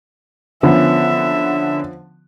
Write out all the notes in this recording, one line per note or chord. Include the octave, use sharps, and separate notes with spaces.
D3 F3 B3 C#4 E5